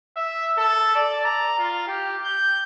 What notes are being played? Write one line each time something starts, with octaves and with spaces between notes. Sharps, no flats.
E5
A4
D5
A#5
F4
G4
G6